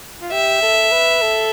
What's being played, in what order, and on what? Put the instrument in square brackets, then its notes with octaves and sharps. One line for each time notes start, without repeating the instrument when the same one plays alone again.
[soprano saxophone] F4
[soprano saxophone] G4 [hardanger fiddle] E5
[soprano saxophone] A4
B4
A4